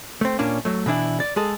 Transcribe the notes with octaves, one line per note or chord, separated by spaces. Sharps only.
A3 C4
A#2 A#3 C#4 D4
F#3 A3
B2 E3 D4 E4
D5
G#3 G#4 A4